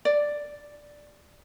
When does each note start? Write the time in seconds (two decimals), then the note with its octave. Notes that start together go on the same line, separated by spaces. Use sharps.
0.05 D5